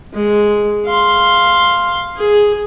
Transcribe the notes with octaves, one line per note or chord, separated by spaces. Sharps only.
G#3
F5 C6
G#4